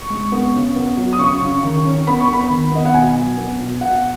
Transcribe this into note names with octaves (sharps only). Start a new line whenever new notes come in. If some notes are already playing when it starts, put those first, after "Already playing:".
Already playing: C#6
G#3
B3
C#3
B3
F#3
D#6
C#3 C#6
C#3
D#3
C#4
B3 B5
C#6
B3
B5
D#3
B3 D#5
F#5
B2 G#5
F#3
B3
B2
B2 F#5